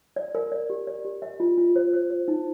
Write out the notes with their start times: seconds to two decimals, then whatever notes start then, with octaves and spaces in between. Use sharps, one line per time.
0.16 D5
0.35 A#4
0.52 D5
0.70 G4
0.87 D5
1.05 G4
1.22 D#5
1.40 F4
1.58 F4
1.76 C5
1.93 C5
2.10 C5
2.28 D#4